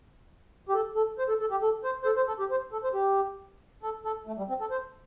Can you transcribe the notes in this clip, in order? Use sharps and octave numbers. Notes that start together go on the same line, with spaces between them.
G4
A4
A4
C5
A4
A4
G4
A4
C5
C5
A4
C5
A4
G4
C5
A4
C5
G4
A4
A4
A3
G3
C4
A4
C5